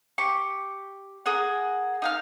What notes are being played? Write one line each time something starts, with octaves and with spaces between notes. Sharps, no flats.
G4 C#6
G#4 A#4 F#5
D#4 F5 F6